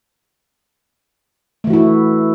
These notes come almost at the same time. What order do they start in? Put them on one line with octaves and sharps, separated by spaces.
A3 E3 F#4 E4